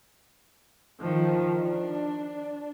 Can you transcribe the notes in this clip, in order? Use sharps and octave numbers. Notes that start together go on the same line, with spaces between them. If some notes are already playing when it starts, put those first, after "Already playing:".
D#3 F3
D4